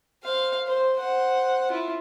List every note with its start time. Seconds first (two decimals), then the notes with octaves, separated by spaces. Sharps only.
0.23 C5 F5
0.67 C5
0.97 C5 F#5
1.71 E4 F4